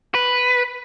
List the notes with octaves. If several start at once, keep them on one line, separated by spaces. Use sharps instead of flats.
B4